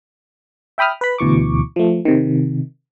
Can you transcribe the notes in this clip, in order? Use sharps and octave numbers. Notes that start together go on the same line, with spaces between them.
E5 G5 B5 D#6 F6
B4 B5
D2 B2 E3 C#6 D6
F3 A3
C3 D#3